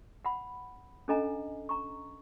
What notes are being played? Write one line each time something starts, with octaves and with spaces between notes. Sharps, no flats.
F#5 B5
C#4 D4 A4 D#5 G#5 A#5
A#5 C#6